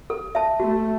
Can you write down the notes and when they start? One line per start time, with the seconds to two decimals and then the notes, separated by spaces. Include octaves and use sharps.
0.10 A4
0.35 E5 A5
0.60 A3 F#4